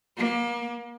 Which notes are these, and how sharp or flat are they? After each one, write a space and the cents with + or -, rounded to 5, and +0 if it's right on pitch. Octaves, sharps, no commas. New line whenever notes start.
A#3 +35